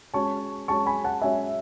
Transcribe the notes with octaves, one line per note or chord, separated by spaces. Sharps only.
G#3 C#4 F#4 C#5 A5 C#6
G#3 C#4 F#4 C#5 A5 C#6
G#5 B5
F#5 A5
G#3 C#4 F#4 C#5 E5 G#5